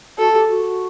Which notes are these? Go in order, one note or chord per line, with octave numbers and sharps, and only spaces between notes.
F#4 A4
G4
F#4